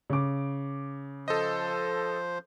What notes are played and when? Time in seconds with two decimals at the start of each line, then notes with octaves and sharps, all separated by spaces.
0.10 C#3 D6
1.28 F3 A4 C5 D#5